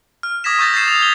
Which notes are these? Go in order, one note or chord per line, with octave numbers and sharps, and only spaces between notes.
F6
D6 D#6 G#6 A#6 B6 E7
C#6 E6 G6 A6 A#6
G6 A6 C7 E7
F7
G#6 G7